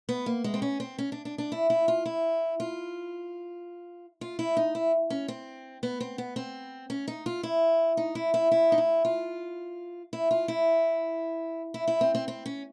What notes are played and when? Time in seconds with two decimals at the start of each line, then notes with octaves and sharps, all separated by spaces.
0.09 B3
0.26 A#3
0.44 G#3
0.54 C4
0.62 C#4
0.80 C4
0.98 C#4
1.12 D4
1.25 D4
1.38 D4
1.52 E4
1.70 E4
1.88 F4
2.06 E4
2.60 F4
4.21 F4
4.39 E4
4.57 D#4
4.75 E4
5.10 C#4
5.28 C4
5.83 B3
6.00 C4
6.18 B3
6.36 C4
6.90 C#4
7.08 D#4
7.26 F4
7.43 E4
7.97 D#4
8.15 E4
8.34 E4
8.51 E4
8.72 D#4
8.78 E4
9.05 F4
10.13 E4
10.31 F4
10.48 E4
11.74 E4
11.88 E4
12.01 C4
12.15 C4
12.28 C4
12.46 C#4